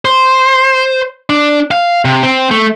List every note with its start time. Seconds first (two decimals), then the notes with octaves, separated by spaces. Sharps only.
0.05 C5
1.30 D4
1.71 F5
2.05 C3
2.23 C4
2.51 A3